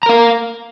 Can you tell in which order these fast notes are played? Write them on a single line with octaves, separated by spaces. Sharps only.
A#5 A#4 F5